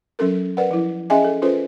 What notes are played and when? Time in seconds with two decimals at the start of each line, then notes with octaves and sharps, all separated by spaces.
0.19 F#3 C#4 A4 A#4
0.57 A#4 B4 D5 F#5
0.71 F3 E4
1.10 C#4 G#4 D#5 E5 G5 G#5
1.25 A4
1.42 C#4 F4 A4 B4 C5